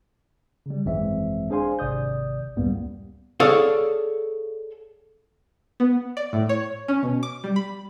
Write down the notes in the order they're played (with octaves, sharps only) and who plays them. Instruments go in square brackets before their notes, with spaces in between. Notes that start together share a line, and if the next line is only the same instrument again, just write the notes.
[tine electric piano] C#3 G3
G#1 F#2 E3 G#3 C4 E5
D4 G#4 C5 F5 G#5 C6
G#1 C3 D5 D#6 G6
C#2 F#2 A2 G3 A#3 B3
[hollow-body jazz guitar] G#4 A4 C#5 D5 F5
[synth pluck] B3
D5
A2
C#5
C#4
B2
D6
G3
B5